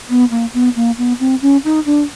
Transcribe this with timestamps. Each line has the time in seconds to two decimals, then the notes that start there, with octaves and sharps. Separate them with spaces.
0.09 B3
0.30 A#3
0.54 B3
0.76 A#3
0.98 B3
1.20 C4
1.42 C#4
1.64 D#4
1.86 D4